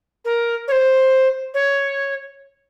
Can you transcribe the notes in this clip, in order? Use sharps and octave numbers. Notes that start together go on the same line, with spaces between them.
A#4
C#5
C5
C#5